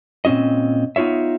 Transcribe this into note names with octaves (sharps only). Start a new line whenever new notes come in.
A#2 C4 C#4 E4 D#5
B3 D#4 F4 C#5 E5